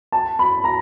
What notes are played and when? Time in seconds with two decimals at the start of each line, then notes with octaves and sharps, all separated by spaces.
0.12 A5
0.39 B5
0.64 A#5